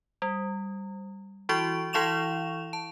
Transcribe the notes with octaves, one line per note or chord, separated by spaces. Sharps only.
G3
E3 E4 F#4 C#6 D7
E3 E4 F5 C#6 E7 F7
A5